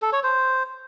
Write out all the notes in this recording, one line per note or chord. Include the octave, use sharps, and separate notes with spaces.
A4
C#5
C5